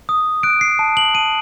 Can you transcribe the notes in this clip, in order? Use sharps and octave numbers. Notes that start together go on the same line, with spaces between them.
D#6
F#6 D7
C7
A5
F#7
A5 D#7